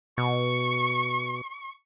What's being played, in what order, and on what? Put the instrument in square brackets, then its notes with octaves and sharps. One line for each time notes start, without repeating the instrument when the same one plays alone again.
[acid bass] B2 [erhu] C#6